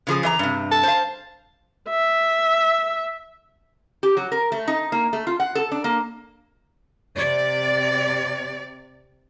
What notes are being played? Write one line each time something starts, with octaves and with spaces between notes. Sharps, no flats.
C#3 F3 G#4
E3 D#5 A#5
G2 C3
A5
C5 F5
E5
G4
F#3
A#4
A3
D#4
A#3
A3
F4
F#5
A4
D4
A#3
C3 D5